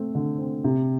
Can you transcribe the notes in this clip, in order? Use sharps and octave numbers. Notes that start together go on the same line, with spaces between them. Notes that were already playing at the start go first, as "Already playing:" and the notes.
Already playing: A3 C4
D3
C4
C3